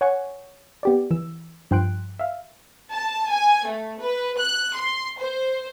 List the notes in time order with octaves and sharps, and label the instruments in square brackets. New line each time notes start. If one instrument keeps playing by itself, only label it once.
[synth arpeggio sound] C#5 F#5 G#5 C#6
B3 G4 D5
E3 E6
G2 F3 G5 C6 F#6 D7
E5 F5
[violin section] A5
G#5
A3
B4
F#6
C6
C5